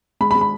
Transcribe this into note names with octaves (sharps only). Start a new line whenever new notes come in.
G#3 B5
B5
G#3
B5